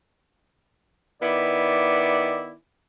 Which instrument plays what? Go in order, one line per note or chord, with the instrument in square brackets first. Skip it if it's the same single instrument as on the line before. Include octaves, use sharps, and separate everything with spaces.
[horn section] D#3 B3 E4 D5